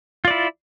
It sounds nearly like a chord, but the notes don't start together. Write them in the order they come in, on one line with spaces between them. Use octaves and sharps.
F4 D5 E4